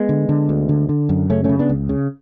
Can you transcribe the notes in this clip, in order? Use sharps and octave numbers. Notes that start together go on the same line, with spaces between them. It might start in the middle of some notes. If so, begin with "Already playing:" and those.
Already playing: G#3 B3
D3
D3
D2
D3
D3
F#2
C#3 A3 C#4
C#3 A3 C#4
B3 D4
C#2
C#3